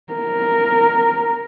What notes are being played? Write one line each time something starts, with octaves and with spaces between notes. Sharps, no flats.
A#4